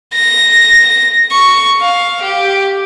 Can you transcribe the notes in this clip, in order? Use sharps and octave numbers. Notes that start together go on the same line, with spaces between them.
A#6
C#6
F5
G4